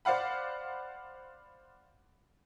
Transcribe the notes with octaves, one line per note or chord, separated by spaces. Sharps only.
C5 D5 F5 F#5 B5